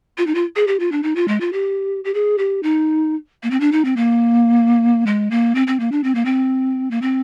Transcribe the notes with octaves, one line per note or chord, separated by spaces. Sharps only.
F4
D#4
F4
G#4
G4
F4
D4
D#4
F4
G#3
F4
G4
G4
G#4
G4
D#4
A#3
C4
D4
D#4
C4
A#3
G#3
A#3
C4
C4
A#3
D4
C4
A#3
C4
A#3
C4